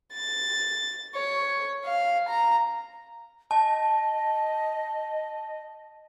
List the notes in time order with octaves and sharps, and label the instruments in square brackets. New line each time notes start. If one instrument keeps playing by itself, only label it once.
[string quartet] A6
C#5
F5
A#5
[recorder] D#5 [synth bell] A5